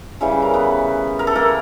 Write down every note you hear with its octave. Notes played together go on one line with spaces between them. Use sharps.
C#3 E3 G3 C5
B4
A#4
B3 B4
A#4
A4
A#3 A#4